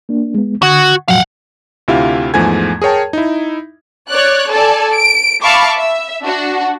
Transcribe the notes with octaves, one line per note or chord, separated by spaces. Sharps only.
A#3 D4
G#3 B3
D3 F#4 D#6 G#6
A2 F3 F#3 F5 F#5
D2 C3 E4 F4 G4 F5
E2 G#2 F3 A3 G#5 G#6
G#4 A#4 C#5 G5 A5
D#4 E4
C#5 D5 F#6
A4 D5 G#5 A5
D7
E5 F5 A5 B5 C#6 D6
E5
D4 F#4